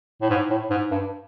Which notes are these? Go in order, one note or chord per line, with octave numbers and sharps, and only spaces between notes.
A2
G#2
A2
G#2
G2